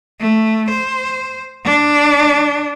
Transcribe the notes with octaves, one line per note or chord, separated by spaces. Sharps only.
A3
C5
D4